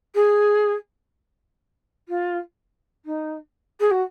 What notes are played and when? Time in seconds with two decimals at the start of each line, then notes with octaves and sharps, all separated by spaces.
0.15 G#4
2.08 F4
3.05 D#4
3.80 G#4
3.90 F#4